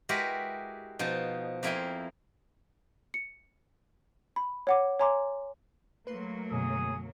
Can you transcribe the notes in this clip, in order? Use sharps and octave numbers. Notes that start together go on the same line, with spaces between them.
G#3 E4 F#4 G4 A#4 B4
B2 F3 D#4 A5
F2 A#3 E4 G5 G#5 C6
C#7
B5
C#5 F#5 D6
C#5 G#5 A#5 C6 D6
F#3 A3 A#3 B4 C6
F#2 B2 D3 G#4 D#6